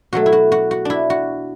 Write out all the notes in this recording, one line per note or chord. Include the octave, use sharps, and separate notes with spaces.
B2 F#3 A3 F#4
E4
F#4
F#4
F#4
D4 E4
F#4